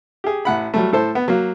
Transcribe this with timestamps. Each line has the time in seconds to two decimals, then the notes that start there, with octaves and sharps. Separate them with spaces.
0.24 G4 G#4
0.45 A1 F#5 B5
0.74 F#3 G3 A3
0.93 A2 A4 C5
1.15 B3
1.28 F#3 A#3